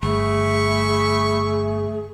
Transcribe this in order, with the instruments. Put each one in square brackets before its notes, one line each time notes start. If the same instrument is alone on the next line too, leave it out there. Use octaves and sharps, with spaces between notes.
[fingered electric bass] G1 [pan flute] A3 [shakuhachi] G#4 [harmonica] E5 B5 C#6